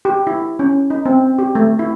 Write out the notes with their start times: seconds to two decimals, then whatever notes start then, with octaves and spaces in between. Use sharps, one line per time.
0.05 G4
0.27 E4
0.59 C#4
0.90 D#4
1.06 C4
1.39 G4
1.55 A3
1.79 E4